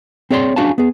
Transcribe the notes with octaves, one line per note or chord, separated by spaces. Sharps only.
C4 G#4 C#5 D5 C6
C#4 D4 F#4 G#4 F5 A5
B3 G#4